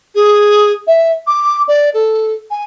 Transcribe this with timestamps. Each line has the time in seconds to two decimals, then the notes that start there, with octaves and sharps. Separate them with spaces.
0.15 G#4
0.87 E5
1.27 D6
1.68 D5
1.93 A4
2.50 G#5